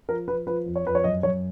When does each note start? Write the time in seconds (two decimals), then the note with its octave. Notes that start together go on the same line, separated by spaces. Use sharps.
0.08 F3 A#4
0.28 F3 B4
0.47 F3 B4
0.66 F2
0.76 C#5
0.85 F2 B4
0.95 C#5
1.04 F#2 D#5
1.23 F#2 C#5